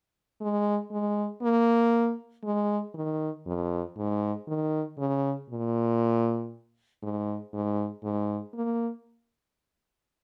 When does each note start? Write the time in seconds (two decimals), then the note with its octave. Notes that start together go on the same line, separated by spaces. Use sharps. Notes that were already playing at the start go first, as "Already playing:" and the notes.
0.41 G#3
0.91 G#3
1.42 A#3
2.45 G#3
2.94 D#3
3.46 F2
3.97 G#2
4.48 D#3
4.98 C#3
5.50 A#2
7.03 G#2
7.53 G#2
8.04 G#2
8.54 A#3